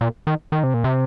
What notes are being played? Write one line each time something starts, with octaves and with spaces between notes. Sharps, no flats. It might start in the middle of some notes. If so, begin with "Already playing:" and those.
A#2
D#3
D#3
C3
A#2
C3